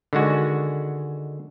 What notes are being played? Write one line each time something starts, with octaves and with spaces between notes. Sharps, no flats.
D3 D#3 G#3 F#4 G#5